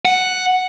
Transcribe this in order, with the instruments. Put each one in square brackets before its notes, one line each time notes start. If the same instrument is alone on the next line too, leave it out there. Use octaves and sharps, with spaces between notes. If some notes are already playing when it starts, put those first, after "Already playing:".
[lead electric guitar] F#5